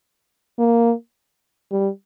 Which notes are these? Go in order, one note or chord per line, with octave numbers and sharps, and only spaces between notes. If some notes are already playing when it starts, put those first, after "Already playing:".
A#3
G3